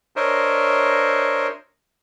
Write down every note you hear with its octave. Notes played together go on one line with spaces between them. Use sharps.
D4 A#4 C5 C#5 D#5 E5